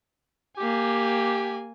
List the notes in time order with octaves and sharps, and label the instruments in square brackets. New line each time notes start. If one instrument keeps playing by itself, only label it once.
[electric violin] A#3 G#5 [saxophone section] G4